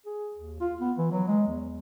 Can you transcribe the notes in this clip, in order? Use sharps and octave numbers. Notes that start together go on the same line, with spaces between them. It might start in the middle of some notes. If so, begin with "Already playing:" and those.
G#4
D#2
F4
B3
E3
F#3
G#3
E2